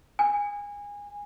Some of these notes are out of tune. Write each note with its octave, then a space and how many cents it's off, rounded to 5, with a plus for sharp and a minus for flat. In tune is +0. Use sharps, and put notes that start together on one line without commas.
G#5 -25